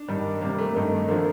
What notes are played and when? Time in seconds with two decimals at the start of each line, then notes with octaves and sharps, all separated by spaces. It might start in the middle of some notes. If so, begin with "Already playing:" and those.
Already playing: D4
0.08 G2 D#3 G3
0.41 C3 G3 A#3
0.58 A3
0.75 G2 D#3 A3
1.08 D3 F3 A3 A#3